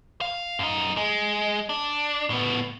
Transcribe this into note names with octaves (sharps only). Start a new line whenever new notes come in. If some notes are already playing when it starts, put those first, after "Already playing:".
F5
F#2 D#4
G#3
D4
A2 B3